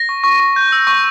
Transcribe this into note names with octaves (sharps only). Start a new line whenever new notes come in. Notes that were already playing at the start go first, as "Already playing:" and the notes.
Already playing: A#6
C#6
C#6
C#6
G6
E6
C#6